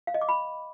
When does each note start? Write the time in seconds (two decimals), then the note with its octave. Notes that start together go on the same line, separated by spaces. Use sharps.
0.07 F5
0.14 D#5
0.21 D6
0.29 B5